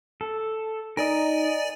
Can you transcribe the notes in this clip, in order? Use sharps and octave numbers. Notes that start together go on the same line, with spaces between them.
A4
D#4 A#4 D5 D#5 G#5